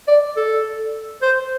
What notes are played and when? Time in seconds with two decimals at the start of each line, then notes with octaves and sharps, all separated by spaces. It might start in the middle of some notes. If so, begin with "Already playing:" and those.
0.08 D5
0.36 A4
1.22 C5